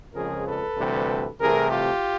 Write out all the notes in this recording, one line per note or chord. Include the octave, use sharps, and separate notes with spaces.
F2 C#3 F3 G#3 G#4 A#4
A4 B4
D2 C3 E3 G3
C2 C3 E3 A3 G#4 A#4
F4 G4